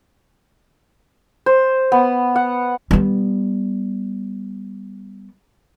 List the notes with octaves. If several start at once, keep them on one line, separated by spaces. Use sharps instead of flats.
C5
B3
F#5
G3 B3